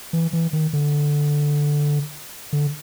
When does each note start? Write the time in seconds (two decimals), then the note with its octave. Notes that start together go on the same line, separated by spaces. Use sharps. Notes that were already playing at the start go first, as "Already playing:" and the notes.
0.13 E3
0.33 E3
0.53 D#3
0.73 D3
2.53 D3